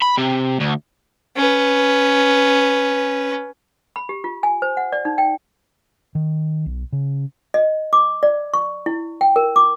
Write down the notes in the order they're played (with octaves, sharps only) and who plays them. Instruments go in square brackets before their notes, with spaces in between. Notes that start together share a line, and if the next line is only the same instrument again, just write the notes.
[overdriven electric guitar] B5
C3
D2
[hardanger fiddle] C#4 B4
[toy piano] B5
G4
F4
G#5
C5
F#5
D5
D#4
G5
[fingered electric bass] D#3
B1
C#3
[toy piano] D#5
D6
D5
C#6
E4
G5
A#4
D6